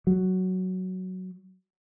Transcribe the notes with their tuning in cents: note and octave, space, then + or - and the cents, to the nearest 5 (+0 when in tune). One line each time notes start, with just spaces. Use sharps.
F#3 +5